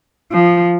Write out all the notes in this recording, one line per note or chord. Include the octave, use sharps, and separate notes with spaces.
F3